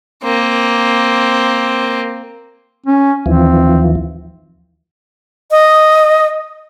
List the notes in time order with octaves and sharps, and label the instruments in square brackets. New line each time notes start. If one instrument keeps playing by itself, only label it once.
[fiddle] A#3 C4
[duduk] C#4
[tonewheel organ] D#2 E3 F3 [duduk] C4
[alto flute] D#5